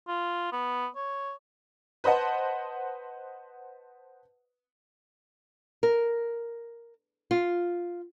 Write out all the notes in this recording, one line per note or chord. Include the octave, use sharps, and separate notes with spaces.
F4
B3
C#5
B4 C5 D#5 F#5 A5
A#4
F4